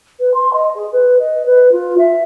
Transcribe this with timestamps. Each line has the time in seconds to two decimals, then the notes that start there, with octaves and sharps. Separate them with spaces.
0.19 B4
0.34 C6
0.53 D#5
0.75 G#4
0.92 B4
1.19 D#5
1.45 B4
1.71 F4
1.98 E5